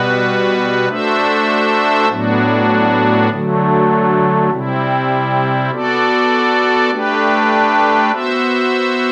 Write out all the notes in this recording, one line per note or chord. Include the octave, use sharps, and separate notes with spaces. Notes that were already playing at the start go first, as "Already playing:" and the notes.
Already playing: B2 G3 B3 F#4 B4
A3 D4 F#4 C5 E5
A2 F#3 B3 D4 F#4
D3 F#3 A3
C3 G3 C4 E4
B3 F#4 A4 D5
A3 D4 G4 B4
B3 F#4 C5 E5